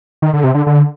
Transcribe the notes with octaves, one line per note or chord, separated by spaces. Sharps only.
D#3
D3
C3
D3
D3